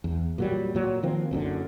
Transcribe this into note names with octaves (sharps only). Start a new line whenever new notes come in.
E2
A#2 F#3 G3
A#2 F#3
D#3 F3 A#3 C4
F#1 F#2 A#2 D3